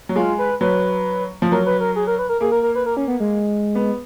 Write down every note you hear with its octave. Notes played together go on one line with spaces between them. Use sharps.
F#3
G#3 F4
B4
F#3 B4
F3
F#3 A#4
B4
A#4
G#4
A#4
B4
A#4
A#3 G#4
A#4
A#4
B4
A#4
C#4
B3
G#3
B3